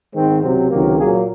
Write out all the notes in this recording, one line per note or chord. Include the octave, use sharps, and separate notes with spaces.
G#2 D#3 G#3 C4
C#2 C3 F#3 C4
C#2 C3 D#3 F#3 A#3
A#2 F#3 A#3 G#4